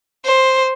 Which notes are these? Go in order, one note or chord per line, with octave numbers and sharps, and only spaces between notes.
C5